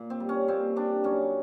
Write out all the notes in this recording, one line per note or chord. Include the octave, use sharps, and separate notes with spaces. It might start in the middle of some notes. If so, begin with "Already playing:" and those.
Already playing: A#2
C4
G3
C#4
A#2 C4
G3 D4
F#2 C#4